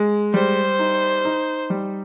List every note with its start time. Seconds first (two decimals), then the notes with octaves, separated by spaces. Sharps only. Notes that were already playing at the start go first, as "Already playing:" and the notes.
Already playing: G#3
0.34 G3 C5
0.79 D#4
1.25 D#4
1.70 G3